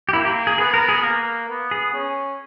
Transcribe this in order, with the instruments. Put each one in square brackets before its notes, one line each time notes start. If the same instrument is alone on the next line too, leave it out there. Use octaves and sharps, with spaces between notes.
[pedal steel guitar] G4
[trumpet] A#3 [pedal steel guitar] E4
[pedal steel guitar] G4
G#4
[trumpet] B3 [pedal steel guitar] G#4
[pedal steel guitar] A#4
G#4
[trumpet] A#3 [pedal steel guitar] A#4
[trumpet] B3
[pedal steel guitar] G#4
[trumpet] C#4